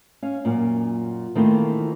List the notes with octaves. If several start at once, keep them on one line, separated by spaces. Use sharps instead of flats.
C#4 F5
F#2 A#2
D#3 E3 A3 A#3 C4 F4